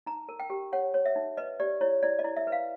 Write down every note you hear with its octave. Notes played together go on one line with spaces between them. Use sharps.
D#4 A#5
A#4
G5
G4
C#5 F#5
C#5
E5
D#4
B4 D#5
G4 D5
E4 C#5
E4 D5
D#5
E4
E5
B4
F5